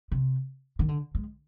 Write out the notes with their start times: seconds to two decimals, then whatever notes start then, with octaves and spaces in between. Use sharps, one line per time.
0.12 C3
0.79 D#3
0.89 D3
1.15 G#3